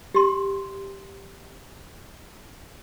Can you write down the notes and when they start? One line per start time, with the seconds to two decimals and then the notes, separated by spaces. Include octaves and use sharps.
0.14 G4 C6